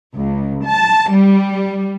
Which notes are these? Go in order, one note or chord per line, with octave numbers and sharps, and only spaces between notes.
C#2
A5
G3